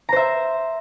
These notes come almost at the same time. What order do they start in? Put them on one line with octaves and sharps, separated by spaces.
A#5 C5 E5